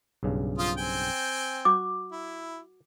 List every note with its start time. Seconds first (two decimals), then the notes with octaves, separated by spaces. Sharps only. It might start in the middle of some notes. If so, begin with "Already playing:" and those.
0.23 B1 G2 C#3
0.58 F3 F4 D#6
0.78 C4 G5 G#5
1.65 F#4 D6
2.12 E4